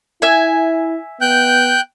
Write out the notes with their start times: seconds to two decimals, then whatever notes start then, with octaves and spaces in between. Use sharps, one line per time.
0.22 E4 E5 G#5
1.21 B3 G5 F#6 G6